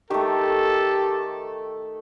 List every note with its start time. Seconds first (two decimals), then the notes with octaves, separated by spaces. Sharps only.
0.10 D#3 A3 G4 A4